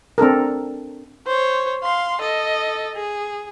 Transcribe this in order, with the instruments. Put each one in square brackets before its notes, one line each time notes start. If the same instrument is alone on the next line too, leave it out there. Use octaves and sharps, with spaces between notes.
[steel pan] C4 D4 A4 A#4
[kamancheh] C5 C#5
F5 C6
A4 D#5
G#4